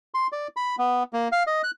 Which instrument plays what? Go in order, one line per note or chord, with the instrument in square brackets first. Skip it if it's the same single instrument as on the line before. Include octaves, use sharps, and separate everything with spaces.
[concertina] C6
D5
B5
B3
A#3
F5
D#5
F#6